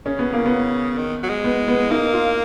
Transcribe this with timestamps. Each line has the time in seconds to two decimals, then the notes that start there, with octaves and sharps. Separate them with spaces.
0.06 C#3 C#4
0.19 B3
0.33 A#3
0.46 B3
0.98 D#3
1.23 F#3
1.29 G#3
1.44 B3
1.68 B3
1.91 A#3 D#4
2.13 F4